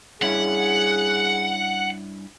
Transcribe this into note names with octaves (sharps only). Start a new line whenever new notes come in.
G2 C#4 E4 G#4 F#5